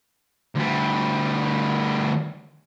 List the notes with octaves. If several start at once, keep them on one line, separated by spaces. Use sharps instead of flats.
D2 G3